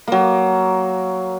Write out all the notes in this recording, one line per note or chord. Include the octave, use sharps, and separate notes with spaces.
F#3 A#3